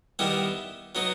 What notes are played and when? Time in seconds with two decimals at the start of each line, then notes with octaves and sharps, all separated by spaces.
0.19 D#3 G3 B3 E4
0.95 F#3 B3 D#4